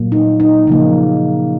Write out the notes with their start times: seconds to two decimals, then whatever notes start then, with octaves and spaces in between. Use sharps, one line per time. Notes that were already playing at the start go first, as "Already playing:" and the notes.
Already playing: A#2 F#3 A#3
0.12 D#4
0.40 D#4
0.67 C#3 F3 A#3